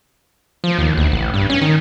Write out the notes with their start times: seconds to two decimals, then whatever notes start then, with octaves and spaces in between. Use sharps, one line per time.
0.64 F3
0.79 D#2
0.97 D2
1.12 A1
1.34 G2
1.50 C#4
1.62 D#3